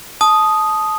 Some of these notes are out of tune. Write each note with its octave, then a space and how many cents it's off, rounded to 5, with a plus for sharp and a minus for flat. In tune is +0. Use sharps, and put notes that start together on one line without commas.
A5 -20 D#6 +0